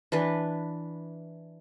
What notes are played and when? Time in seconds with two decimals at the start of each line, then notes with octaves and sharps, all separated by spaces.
0.12 E3 D4 B4